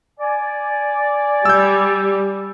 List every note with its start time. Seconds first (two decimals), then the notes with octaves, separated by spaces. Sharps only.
0.19 D5 G#5
1.45 G3 E6 G6